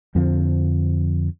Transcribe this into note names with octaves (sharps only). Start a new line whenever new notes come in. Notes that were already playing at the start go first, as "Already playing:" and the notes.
F2 D3 F3 C4